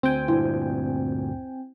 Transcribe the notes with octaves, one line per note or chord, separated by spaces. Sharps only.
D2 C4 G5 G#5
D2 G2 A#2 E4